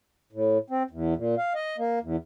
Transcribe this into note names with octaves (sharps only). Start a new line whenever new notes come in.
A2
C4
E2
A#2
F5
D#5
A#3
E2